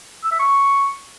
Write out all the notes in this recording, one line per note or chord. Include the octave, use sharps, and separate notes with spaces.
E6
E5
C#6